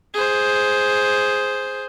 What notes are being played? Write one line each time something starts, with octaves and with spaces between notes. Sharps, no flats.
G#4 C5